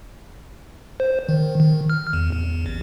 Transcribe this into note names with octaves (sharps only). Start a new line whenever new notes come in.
C5
D#3
D#3
F6
E2
E2
A1